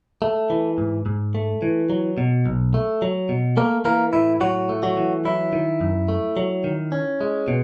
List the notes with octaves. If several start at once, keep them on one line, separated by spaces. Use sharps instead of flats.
A3
E3
G#2
G#2
A3
E3
F#3
B2
B1
A3
F#3
B2
A3 A#3 A#4
E3 A#3 A#4
A2 E4
A2 F#3 F#4
A3
F#3 F#4
E3
F#3 E4
D#3
F#2
A3
F#3
D#3
C#4
G#3
B2